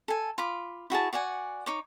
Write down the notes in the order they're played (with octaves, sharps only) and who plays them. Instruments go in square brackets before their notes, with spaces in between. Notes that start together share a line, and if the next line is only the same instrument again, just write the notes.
[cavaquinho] A4 G#5
F4 B5 D6
E4 F#4 G#4 A5
F#4 D5 F#5 G#5
D#4 C#5 D6